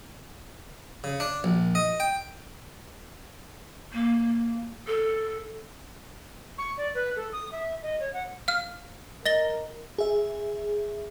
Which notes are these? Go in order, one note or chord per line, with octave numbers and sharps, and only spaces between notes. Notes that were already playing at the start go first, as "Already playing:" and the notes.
C#3
D4
A#1
D#5
G5
A#3
A4
C#6
D5
B4
A4
D#6
E5
D#5
C#5
F#5
F5 F6
A#4 D#5 A#6 G7
G#4 E5